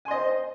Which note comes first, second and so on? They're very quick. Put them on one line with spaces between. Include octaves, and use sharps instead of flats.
G#5 C6 D#5 C5